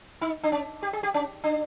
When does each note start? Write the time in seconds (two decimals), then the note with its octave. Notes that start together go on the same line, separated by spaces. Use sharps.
0.21 D#4
0.43 D4
0.52 C#4
0.83 G4
0.93 G#4
1.03 G4
1.14 C#4
1.44 D4